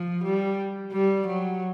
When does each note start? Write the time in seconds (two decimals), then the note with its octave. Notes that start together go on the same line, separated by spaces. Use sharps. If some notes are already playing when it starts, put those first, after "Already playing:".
Already playing: F3
0.24 G3
0.92 G3
1.26 F#3